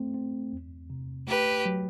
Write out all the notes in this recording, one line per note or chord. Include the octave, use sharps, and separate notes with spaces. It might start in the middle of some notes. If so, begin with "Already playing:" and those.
Already playing: A3 C4
C4
E2
C3
A3 G4 B4
F#3